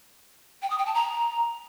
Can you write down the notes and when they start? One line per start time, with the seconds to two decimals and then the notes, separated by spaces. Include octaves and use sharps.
0.62 G5
0.70 D#6
0.78 G5
0.86 A5
0.94 A#5